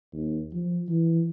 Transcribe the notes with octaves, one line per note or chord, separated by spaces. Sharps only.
D#2
F3
E3